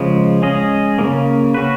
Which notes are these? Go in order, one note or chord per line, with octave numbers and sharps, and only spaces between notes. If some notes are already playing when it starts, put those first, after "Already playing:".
Already playing: C#3 F3 G#3
G#3 C#4 G#4 D#5
C#3 F3 A#3
C#4 F#4 B4